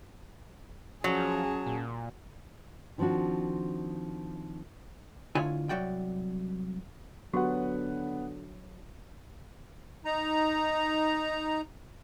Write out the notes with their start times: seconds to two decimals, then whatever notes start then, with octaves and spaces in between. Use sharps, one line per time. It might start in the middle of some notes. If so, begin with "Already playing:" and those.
1.04 F3 F#3 C#4 G#4 A5
1.66 A#2
2.98 D#3 F3 C4 D4 F#4
5.35 D2 D3 E4 F4 C#5 G#5
5.69 C2 F#3 F#4 D5 G5
7.34 D3 F#3 B3 F#4 G4 B4 F#5
10.05 D#4 A#5